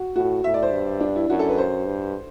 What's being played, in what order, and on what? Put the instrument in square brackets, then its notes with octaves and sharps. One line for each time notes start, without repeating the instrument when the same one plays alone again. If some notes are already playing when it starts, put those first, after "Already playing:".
Already playing: [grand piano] F#4
[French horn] A2 [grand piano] F#4
[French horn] A2 [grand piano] E5
[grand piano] D5
C5
[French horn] G2
[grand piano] D4
E4
[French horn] F#2 [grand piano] F#4
[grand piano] A4
B4
C5
[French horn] G2